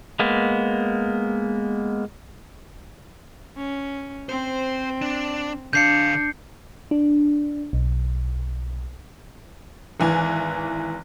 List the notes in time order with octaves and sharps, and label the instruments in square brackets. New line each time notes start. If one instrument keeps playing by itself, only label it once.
[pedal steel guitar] G#3 A#3 B3
[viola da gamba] C#4
[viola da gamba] C4 [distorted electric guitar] C5
[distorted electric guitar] D4
[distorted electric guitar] D3 F5 [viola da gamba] D4 [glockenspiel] G6 C7 C#7
[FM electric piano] D4
B1
[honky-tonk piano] G#1 E3 G#5